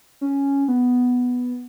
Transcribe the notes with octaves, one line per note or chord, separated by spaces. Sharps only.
C#4
B3